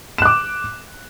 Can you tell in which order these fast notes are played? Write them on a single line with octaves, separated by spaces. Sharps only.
E7 F#6 D6